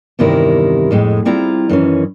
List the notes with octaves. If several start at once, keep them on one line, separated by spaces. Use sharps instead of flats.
E2 G2 C3 D#3 E4 A#4
F2 A2 G#3
G3 C4 E4 F4 A#5
F#2 D#3 E3 C#4